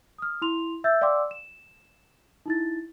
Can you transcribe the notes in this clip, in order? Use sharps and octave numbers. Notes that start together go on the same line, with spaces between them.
D#6 F6
E4 C6 F7
E5 E6 G6 A6
D5 F5 G5 C6 D6 E6
E7
D#4 E4 A6